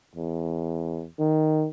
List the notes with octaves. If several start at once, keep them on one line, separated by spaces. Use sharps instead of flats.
E2
D#3